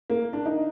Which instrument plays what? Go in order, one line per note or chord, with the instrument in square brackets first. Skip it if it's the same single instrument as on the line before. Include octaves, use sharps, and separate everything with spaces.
[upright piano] A#3
D4
D#4